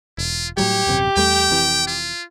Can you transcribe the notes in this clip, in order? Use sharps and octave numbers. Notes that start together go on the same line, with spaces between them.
E1 F4
A2 F#3 G3 G4 C#5
D#1 F#2 C3
E2 G3 A3 G5
F1 C3 E3
F4